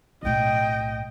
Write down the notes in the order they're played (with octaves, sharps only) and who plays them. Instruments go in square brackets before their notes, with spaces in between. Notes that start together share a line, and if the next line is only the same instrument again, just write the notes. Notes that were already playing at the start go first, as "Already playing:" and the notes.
[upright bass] B1 A2 [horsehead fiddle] D#5 G5